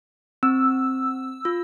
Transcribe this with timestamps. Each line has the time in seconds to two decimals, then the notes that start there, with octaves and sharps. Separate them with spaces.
0.43 C4 E6
1.45 F4